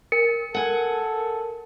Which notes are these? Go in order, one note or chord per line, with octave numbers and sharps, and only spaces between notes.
A#4 C#7
A4 F#5 G#5